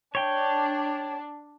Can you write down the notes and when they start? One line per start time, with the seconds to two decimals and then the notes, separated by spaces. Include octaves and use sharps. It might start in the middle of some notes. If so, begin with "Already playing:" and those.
0.15 D4 C#5 G5